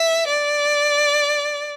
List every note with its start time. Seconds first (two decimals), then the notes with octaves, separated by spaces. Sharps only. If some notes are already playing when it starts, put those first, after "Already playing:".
Already playing: E5
0.27 D5